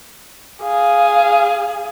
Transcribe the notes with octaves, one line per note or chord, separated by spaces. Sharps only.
G#4 F5